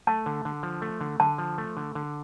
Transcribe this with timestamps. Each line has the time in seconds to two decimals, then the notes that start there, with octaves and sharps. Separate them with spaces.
0.07 A3 A5
0.26 D3
0.45 D3
0.63 F3
0.82 A3
1.01 D3
1.20 D3 A5
1.38 F3
1.58 A3
1.77 D3
1.95 D3